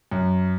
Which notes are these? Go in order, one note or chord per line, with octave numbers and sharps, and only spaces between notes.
F#2